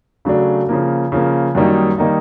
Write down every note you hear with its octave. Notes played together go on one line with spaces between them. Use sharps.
C#3 F#3 A3 D4
C#3 F3 A#3
C#3 F3 A#3
F#2 D#3 G3 A#3 D#4
D#3 G3 A#3 D#4